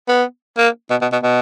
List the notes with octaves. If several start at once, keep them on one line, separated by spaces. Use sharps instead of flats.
B3
A#3
B2
B2
B2
B2